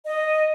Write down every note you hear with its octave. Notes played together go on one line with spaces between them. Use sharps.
D#5